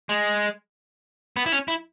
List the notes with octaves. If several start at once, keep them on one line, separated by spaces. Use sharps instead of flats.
G#3
B3
E4
C#4
E4